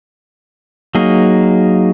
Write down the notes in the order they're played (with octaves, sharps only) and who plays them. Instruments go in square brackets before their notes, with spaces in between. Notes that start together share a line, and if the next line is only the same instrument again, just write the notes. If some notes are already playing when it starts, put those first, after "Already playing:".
[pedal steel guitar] F#3 A#3 D#4 G#4